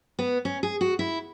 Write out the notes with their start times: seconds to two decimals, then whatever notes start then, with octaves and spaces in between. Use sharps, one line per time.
0.19 B3
0.45 C#4
0.63 G#4
0.81 F#4
0.99 E4